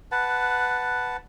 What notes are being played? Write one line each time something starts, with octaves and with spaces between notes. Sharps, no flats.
B4 F#5 A5